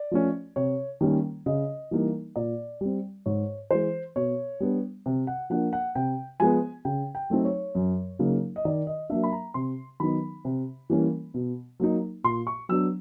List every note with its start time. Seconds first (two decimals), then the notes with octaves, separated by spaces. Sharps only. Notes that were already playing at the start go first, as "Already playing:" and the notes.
Already playing: D5
0.11 F3 A3 C#4
0.56 C3 C#5
1.01 D#3 G3 A#3 C#4
1.46 C#3 D#5
1.91 E3 G3 A#3 D#4
2.36 A#2 D5
2.81 G3 C4
3.26 G#2 C#5
3.71 E3 G#3 C5
4.16 B2 C#5
4.60 G3 B3 D4
5.06 C3
5.27 F#5
5.50 F3 A#3 D4 F#5
5.73 F#5
5.95 C3 G5
6.40 F3 G#3 B3 G#5
6.85 C#3 G5
7.15 G5
7.30 F#3 A3 C4 D#4
7.45 C#5
7.75 F#2
8.19 C#3 F#3 A#3 D#4
8.56 D#5
8.65 D#3 D5
8.87 D#5
9.09 F#3 A#3 D4 E5
9.24 B5
9.32 A#5
9.54 C3 C6
10.00 D#3 F#3 B3 D#4 B5
10.45 C3
10.90 E3 G3 A#3 C#4
11.34 B2
11.80 F#3 A#3 D#4
12.24 A#2 C6
12.47 C#6
12.69 F#3 B3 D4 E6